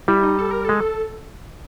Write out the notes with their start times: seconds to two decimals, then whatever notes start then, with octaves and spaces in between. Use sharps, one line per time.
0.08 G3 E4
0.23 D#4
0.39 A4
0.51 A#4
0.65 G#3 A4